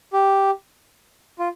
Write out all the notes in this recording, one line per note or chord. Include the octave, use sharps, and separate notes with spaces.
G4
F4